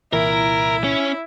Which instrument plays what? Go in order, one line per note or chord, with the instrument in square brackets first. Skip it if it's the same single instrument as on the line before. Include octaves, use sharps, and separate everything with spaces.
[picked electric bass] C2 A#2 E3 [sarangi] E4 [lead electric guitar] A#4
[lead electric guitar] C#4